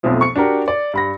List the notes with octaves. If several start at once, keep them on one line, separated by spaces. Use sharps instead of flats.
B1 F2 B2 F3 A3
C#6 C#7
D4 F#4 G4 A#4
D5
G2 B5 A#6